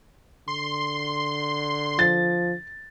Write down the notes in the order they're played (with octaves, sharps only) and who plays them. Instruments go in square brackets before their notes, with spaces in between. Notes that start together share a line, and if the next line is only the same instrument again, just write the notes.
[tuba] D3 [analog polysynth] C6
[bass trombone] F3 [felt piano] A6